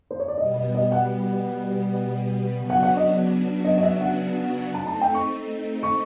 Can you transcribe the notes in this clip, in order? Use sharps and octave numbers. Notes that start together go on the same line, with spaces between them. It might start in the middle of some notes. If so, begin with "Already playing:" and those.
C5
C#5
D5
B2 G3 B3 D#5
D#5
D#5
F#5
C#3 F#3 B3 D4 F#4
F#5
F#5
D#5
D#5
D#5
E5
F#5
A3 C4 D#4 A5
A5
G5
C#6
C#6